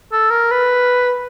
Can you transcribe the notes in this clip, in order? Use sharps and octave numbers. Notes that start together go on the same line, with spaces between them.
A4
A#4
B4